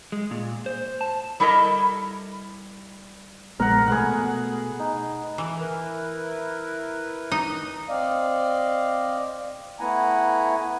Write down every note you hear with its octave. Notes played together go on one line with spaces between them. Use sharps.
G#3
A#2
C5
A5
G3 E4 A4 A#4 D#5
A#1 G#3 B3 A#4 F#5
B2 A3 G#4 B4 F#5
D#4
E3
E4 A#4 B4
D#4
C4 D5 D#5 F5
A3 B3 E4 F#5 G#5 A#5